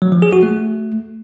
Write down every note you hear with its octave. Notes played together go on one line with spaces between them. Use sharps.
F#3
F3
G#4
F#4
A3